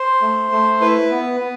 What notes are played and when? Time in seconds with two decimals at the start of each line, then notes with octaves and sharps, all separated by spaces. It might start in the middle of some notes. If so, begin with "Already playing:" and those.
Already playing: C5
0.22 A3
0.52 A3
0.81 E4 B4
1.11 B3
1.40 B3